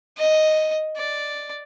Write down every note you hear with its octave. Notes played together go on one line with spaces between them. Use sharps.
D#5
D5